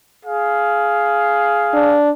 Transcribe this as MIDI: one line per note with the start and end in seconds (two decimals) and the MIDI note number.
0.24 1.98 68
0.24 1.98 77
1.73 2.10 62